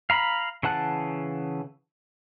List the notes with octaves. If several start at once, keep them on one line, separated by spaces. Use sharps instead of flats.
F5 A#5 B5
C#3 E3 F#5 A5 F#6